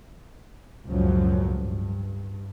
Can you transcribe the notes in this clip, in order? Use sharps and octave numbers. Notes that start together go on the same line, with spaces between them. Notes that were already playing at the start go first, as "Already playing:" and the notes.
C#2 F#2 A2 F3 F#3
G2